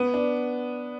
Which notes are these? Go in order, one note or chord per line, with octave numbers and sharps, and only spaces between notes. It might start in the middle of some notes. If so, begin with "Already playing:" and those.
Already playing: B3
D4